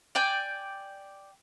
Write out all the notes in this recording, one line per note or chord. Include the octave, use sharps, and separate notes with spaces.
D5 G5 G#5